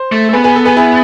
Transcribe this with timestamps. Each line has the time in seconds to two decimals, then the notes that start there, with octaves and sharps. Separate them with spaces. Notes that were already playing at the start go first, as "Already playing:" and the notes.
Already playing: C5
0.12 A3
0.29 A4
0.33 B3 G#4 B4
0.44 G#4 B4
0.56 A4
0.65 G#4 B4
0.77 E4 G#4